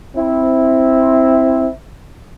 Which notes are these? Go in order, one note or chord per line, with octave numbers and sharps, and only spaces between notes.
C4 E4